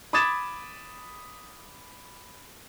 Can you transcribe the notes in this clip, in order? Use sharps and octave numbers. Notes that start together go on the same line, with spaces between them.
B5 D6 D#6 G#6 A6 E7